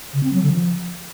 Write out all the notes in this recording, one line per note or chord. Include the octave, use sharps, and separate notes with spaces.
C#3
C4
F#3
D3
F3